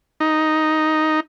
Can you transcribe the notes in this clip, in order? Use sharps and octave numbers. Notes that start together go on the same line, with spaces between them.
D#4